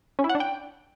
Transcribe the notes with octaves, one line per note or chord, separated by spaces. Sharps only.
C#4
E4
F#5
D4
G5